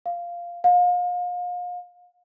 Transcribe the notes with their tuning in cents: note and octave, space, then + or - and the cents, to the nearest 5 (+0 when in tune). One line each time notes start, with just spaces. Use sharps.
F5 -5
F5 +35